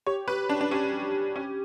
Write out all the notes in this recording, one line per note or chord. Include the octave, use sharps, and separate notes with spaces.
G4 C#5
B4
D4
D4
C#4 G4
C#4